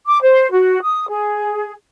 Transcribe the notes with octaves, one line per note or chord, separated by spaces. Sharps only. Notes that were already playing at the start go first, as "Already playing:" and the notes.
D6
C5
F#4
D#6
G#4